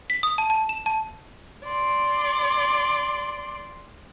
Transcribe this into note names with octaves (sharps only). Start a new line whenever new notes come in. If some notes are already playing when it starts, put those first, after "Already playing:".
B6
D#6
A5
A5
E7
A5
D5 C6